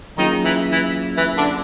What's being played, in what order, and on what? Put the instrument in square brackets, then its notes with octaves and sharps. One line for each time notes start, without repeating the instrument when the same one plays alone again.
[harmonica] D#3 D#4 [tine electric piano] F#3 A#3 C#4 F4 G#4
[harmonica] E3 E4
E3 E4
E3 E4
D3 D4